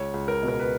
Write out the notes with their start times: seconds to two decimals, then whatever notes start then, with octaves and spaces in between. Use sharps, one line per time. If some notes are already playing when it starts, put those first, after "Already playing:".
Already playing: C#2 C#5
0.14 C#2
0.28 A#4
0.43 B2
0.48 A#4
0.60 B4